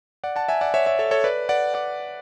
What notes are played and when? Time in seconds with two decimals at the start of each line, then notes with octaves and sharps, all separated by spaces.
0.24 D5 F#5
0.36 F#5 A5
0.48 E5 G#5
0.61 D5 F#5
0.74 C#5 E5
0.86 C#5 E5
0.99 A4 C#5
1.11 A4 C#5
1.24 B4 D5
1.49 D5 F#5
1.74 D5 F#5